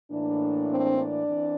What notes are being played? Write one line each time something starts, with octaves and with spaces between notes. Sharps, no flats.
A2 E3 A#3 D4
C4 C5
D4 D5
E3 C4